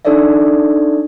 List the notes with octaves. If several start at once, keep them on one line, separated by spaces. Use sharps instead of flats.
D4 D#4 A4 C#5 D5 E5